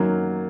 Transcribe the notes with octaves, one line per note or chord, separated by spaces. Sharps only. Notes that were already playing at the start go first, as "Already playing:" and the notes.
Already playing: F#2 D#3 F#3 A#3